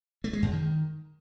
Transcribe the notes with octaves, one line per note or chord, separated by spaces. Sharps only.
A3
G#3
F#2
D#3